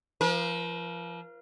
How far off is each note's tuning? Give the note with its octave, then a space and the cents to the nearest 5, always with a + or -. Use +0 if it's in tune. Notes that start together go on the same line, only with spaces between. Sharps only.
F3 -25 A#4 +40